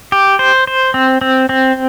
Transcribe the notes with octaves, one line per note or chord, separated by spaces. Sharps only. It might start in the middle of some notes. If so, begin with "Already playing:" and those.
G4
C5
C5
C4
C4
C4